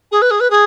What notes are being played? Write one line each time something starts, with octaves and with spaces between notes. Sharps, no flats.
G#4
B4
G#4
B4
G#4